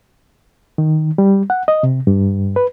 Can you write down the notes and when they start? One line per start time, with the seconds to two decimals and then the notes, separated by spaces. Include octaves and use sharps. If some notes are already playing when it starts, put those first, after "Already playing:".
0.78 D#3
1.18 G3
1.50 F#5
1.68 D#5
1.83 C3
2.07 G2
2.56 B4